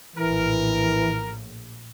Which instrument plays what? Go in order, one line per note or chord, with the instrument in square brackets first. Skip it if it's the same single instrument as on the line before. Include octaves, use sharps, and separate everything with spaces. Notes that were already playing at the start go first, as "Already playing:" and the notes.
[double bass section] A#1 A2 [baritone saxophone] E3 [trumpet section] A#4